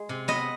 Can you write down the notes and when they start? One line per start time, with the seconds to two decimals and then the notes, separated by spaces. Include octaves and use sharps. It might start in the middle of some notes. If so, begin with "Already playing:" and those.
Already playing: G#3
0.09 C3
0.28 B3 D#5